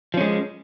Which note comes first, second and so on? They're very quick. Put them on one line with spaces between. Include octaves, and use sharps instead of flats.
F3 C#4 G#3